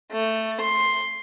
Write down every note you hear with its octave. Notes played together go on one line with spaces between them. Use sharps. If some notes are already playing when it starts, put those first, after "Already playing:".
A3
C6